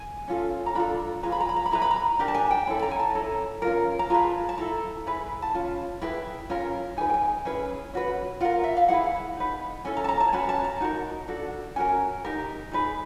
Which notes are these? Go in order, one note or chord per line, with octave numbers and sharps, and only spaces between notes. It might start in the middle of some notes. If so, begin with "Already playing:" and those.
Already playing: G#5
C#4 F4 A4
A#5
D4 F4 A4 B5
F4 G#4 B4 A#5
B5
A#5
B5
A#5
B5
E4 G#4 B4 A#5
B5
A#5
D4 G4 A#4 A#5
A5
G#5
G5
C#4 E4 A4 B5
A#5
G#5
A5
C#4 E4 A4 A#5
C#4 F4 A#4
A#5
F4 G#4 B4 A5
A5
E4 A4 A#5
E4 G#4 B4
A5
C#4 F4
E4 G#4 B4 G5
C#4 F4 A#4
D#4 G#4 B4 G#5
G5
G#5
C#4 E4 G#4 B4
C#4 F#4 B4
F4 A#4 F#5
E5
F5
E4 G#4 B4 F#5
D#4 G#4 B4
C#4 E4 A4 G#5
A#5
A5
A#5
A5
C#4 F#4 B4 G#5
A5
A#5
D#4 F#4 A#4
D4 F#4 A4
C#4 F#4 A#4 G#5
D#4 G4 A#4
D#4 G#4 B4